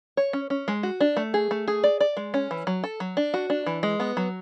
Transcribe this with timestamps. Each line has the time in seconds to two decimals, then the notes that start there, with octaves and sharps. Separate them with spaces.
0.17 C#5
0.33 C#4
0.50 C#4
0.68 G#3
0.83 F#4
1.01 D4
1.17 A3
1.34 G#4
1.51 A3
1.68 G#4
1.84 D5
2.00 D5
2.17 G#3
2.34 C#4
2.51 E3
2.67 F#3
2.84 A4
3.00 F#3
3.17 D4
3.34 F#4
3.50 D4
3.66 E3
3.83 G#3
4.00 B3
4.17 F#3